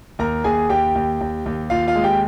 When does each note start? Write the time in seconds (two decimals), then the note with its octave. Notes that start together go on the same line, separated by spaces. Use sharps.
0.19 D#2 A#4 A#5
0.44 D#2 G#4 G#5
0.69 D#2 G4 G5
0.95 D#2
1.21 D#2
1.46 D#2
1.70 D#2 F4 F5
1.87 F4 F5
1.96 G#3
2.04 G4 G5